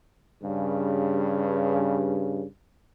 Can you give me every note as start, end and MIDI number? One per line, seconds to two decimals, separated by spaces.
0.43 2.44 43
0.43 2.44 49